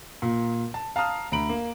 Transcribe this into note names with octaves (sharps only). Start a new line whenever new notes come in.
A#2
A5
F5 A5 A#5 D#6 F6
D2 A#5 B5 D7 F#7
A#3